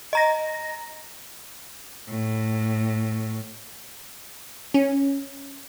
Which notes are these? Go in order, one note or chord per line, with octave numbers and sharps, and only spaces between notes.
D#5 A#5 A#6
A2
C#4